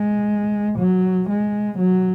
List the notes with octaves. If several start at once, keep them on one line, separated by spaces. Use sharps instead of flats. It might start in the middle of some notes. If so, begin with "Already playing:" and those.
Already playing: G#3
F#3
G#3
F#3